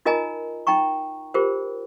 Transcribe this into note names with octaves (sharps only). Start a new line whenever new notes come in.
D#4 F4 A#4 D#5 G#5 A#5
D#4 G5 A#5 C#6
F4 G4 A#4 C5